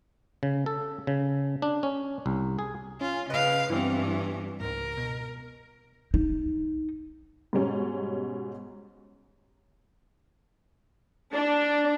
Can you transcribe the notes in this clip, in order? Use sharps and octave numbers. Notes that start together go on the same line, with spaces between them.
C#3
A4
C#3
D4
C#4
C2
G#4
C#4 F4
C#3 B4 D#5 F5
G2 E3 B3 C4 E4
C#2 G#2 A#4
B2
D#4
G#2 B2 G3 C#4
D4